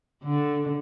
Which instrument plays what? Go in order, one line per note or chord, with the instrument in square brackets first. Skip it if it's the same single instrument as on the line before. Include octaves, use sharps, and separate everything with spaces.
[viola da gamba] D3